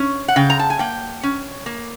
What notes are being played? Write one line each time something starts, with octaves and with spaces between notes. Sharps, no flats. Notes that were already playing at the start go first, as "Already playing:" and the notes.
Already playing: C#4
F#5
C#3 G5
A#5
A5
G#5
A#3 G5
C#4
A#3